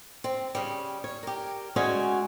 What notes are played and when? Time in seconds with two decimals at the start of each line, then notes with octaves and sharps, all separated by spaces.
0.24 C4
0.55 C#3 G3
1.04 C#5
1.23 G4 A#4
1.76 G#3 A3 C#4 F#4 D5 G#5